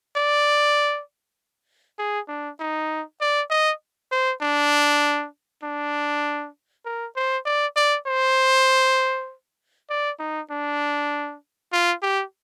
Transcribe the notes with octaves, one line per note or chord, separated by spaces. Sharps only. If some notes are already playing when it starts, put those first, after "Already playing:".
D5
G#4
D4
D#4
D5
D#5
C5
D4
D4
A#4
C5
D5
D5
C5
D5
D#4
D4
F4
G4